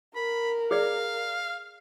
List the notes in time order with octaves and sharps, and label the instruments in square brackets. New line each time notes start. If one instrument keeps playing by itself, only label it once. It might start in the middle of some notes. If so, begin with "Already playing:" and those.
[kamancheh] A#4 [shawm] B5
[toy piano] G#4 D5 [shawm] F5